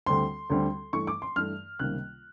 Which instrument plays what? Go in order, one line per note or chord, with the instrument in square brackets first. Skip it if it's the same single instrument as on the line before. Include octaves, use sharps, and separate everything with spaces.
[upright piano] D2 D3 G3 C4 C6
D2 D3 G3 C4
G2 E3 A3 C#6
D6
C6
G2 E3 A3 F6
C#2 C3 D#3 G3 A#3 F#6